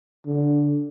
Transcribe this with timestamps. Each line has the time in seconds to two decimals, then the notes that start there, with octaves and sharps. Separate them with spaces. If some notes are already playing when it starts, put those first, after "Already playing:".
0.26 D3